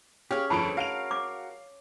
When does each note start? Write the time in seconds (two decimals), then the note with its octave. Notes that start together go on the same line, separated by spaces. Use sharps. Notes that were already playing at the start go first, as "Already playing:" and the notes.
0.31 C#4 G4 G#4 F5
0.50 G1 F2 A4 A5 B5 C#6 D7
0.77 F#4 A#4 F5 D7 F7
1.11 D6